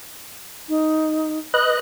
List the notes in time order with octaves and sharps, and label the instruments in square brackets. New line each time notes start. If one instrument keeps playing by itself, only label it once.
[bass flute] D#4
[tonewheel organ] B4 D#5 F#6